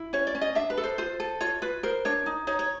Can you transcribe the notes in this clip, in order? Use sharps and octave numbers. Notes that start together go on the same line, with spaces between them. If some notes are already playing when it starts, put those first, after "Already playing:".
Already playing: E4
C#4 C#5
D5
C#4
D#5
D4 E5
B4
A4
C5
F4 C5
A4
F4 C#5
F4 B4
A#4 C5
D4 C#5
D#4
D#4 C#5
C#5